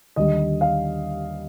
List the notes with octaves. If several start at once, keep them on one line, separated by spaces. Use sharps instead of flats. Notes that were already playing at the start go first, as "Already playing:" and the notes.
D#2 D3 G3 D#5
F5